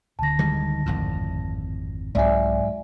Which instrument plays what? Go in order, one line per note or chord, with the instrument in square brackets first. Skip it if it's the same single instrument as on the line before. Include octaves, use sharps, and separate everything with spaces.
[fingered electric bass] D1 D3 [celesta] A5 A#6
[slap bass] D#3 G3 G#3
G#1 F2 A2
[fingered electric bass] C2 C4 [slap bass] G#2 F#3 [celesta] D5 E5 G#5